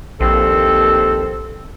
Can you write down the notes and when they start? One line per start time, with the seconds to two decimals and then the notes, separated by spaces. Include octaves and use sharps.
0.20 A#1 D#2 C4 A4